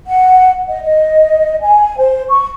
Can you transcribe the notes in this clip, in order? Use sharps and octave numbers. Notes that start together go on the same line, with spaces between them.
F#5
D#5
D#5
G#5
C5
C#6